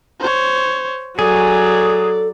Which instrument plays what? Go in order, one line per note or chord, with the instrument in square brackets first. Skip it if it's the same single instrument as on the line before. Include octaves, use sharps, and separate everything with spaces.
[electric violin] C5 C#5
[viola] F#3 [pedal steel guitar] G#4 [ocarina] A4 [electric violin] D5